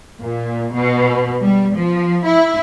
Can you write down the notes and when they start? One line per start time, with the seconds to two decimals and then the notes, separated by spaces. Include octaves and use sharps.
0.21 A#2
0.73 B2
1.41 G3
1.74 F3
2.25 E4